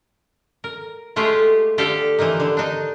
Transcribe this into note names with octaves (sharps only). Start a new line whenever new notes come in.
A#4
G#3 A3 F4 G4 G#4
D3 G4 A4 F5
E3 F3 A#3 D#4
D3
D4 D#4